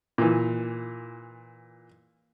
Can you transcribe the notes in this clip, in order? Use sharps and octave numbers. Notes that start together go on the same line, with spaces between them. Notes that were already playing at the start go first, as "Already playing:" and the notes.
A#2 E3